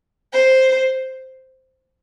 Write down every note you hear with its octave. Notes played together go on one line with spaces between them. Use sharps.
C5